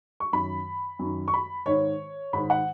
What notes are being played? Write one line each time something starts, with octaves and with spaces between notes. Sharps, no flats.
C#6
F#2 D#3 B5
F#2 D#3
C#6
B5
G#2 D#3 C#5
G#2 D#3 B5
F#5